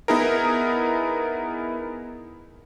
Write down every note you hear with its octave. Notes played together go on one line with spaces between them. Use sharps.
B3 D#4 E4 G#4 A#4